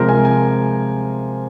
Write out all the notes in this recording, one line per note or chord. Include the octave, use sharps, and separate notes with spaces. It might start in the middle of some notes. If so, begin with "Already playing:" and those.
Already playing: C3 F3 G#3 A#4 C5
G#5
G#5